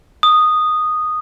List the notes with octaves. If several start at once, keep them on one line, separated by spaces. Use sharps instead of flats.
D#6